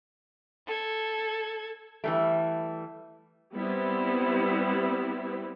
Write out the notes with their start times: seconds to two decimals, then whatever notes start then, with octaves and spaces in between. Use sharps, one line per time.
0.67 A4 G#6
2.04 E3 G3 A3
3.54 G3 B3 C4 E4